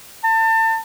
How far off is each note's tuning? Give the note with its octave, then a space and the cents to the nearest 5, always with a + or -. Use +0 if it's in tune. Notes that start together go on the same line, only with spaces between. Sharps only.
A5 +30